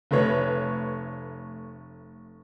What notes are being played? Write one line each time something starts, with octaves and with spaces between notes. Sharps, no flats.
F1 A3 B4 C#5